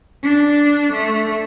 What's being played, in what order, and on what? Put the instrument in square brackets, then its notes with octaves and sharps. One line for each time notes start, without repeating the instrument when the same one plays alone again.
[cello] D4
A3